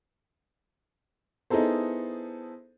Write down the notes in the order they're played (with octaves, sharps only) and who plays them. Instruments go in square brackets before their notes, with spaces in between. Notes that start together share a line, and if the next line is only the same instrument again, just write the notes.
[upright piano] B3 D#4 E4 G#4 A4 C5